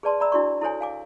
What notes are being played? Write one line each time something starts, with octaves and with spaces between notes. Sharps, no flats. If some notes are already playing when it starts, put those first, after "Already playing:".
G#4 B4 D5 A5 C6
D5 E5 A#5 B5 E6
D4 E4 F#4 D5 C#6
E4 A4 C5 C#5 G#5
F5 G#5 D6